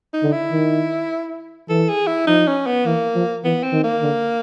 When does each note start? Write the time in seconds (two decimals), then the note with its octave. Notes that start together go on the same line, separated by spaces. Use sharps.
0.13 D#4
0.23 D3
0.32 E4
0.52 D#3
1.69 E3 A4
1.89 G#4
2.07 E4
2.27 F3 D#4
2.47 C#4
2.67 B3
2.85 E3 A#3
3.15 F3
3.44 E3 B3
3.63 C4
3.73 D#3
3.84 A#3
4.02 D3